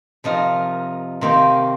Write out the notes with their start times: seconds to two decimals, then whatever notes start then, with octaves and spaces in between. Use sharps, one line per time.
0.24 C3 F3 D#4 A#4
1.21 C3 D#3 A#3 G4 C5